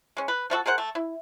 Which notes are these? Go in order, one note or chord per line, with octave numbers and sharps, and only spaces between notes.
G#3 C#4
B4
F3 F4 F#4 A4
G#4 A#4 C5 F#5
A3
E4